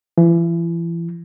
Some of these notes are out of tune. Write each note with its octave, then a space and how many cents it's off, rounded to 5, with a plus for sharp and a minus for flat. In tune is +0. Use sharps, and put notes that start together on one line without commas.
E3 +35